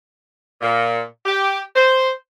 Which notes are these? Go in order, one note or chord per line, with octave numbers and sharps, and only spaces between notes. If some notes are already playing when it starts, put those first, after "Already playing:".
A#2
G4
C5